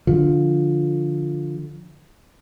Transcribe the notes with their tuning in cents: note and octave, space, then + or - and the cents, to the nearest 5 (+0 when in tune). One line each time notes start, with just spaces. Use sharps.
D3 +0 F3 +0